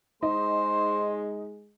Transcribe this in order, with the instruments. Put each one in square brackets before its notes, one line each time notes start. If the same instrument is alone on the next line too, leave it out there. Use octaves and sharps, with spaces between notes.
[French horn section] G#3 [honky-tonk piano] D#4 [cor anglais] C5